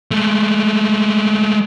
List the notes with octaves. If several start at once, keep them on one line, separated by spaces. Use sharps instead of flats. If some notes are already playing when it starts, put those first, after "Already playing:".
G#3 A3